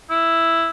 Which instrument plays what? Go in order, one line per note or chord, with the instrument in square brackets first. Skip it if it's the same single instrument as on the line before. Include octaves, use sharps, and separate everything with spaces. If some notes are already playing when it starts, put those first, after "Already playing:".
[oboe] E4